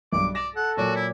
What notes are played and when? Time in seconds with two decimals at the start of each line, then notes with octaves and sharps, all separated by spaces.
0.13 B1 G2 D6
0.35 D5 A#6 E7
0.56 A4 F#5
0.77 A#2 F#3 F#4 D6
0.96 E4